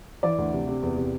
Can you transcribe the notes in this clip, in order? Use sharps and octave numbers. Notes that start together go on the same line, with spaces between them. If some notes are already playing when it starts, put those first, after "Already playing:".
E3 D5
D2
C3
C3
E2
C3